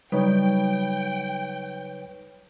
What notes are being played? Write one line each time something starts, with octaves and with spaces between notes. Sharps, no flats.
C#3 F#3 G3 D#4 B4 C#5 G5